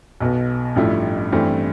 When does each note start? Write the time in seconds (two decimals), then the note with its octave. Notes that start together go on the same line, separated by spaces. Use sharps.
0.21 B1 B2 B3
0.76 A1 G2 F3 A3 E4
1.32 G2 E3 A3 C4